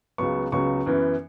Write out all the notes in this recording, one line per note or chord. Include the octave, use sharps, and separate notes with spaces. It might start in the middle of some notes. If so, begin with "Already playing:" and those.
C#2 C#3 F#3 B3 C#6
C#2 C#3 F#3 B3 C#6
F#2 E3 B3